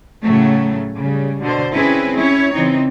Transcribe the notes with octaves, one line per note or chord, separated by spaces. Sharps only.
A2 C#3 F#3 A3
C#3 G3
B2 D3 C5
C4 C#4 E4 G#4 B4
C#4 E4 C#5
C#3 E3 C4 D#4